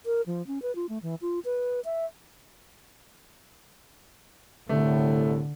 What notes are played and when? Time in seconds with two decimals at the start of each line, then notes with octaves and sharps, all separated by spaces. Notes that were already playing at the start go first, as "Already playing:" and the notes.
0.06 A#4
0.26 F3
0.47 C#4
0.62 B4
0.76 F4
0.89 A3
1.03 E3
1.22 F4
1.45 B4
1.85 E5
4.69 C2 A2 D3 A3